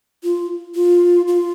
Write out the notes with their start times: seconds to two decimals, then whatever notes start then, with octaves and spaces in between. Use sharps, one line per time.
0.23 F4
0.75 F4
1.28 F4